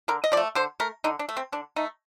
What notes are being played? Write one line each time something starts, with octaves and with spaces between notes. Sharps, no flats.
D3 A#4
D#5
F3 D5
A3
D3 C5
A3 A#4
D3 D#4
D4
A3
C4
D3 D4
A3 D#4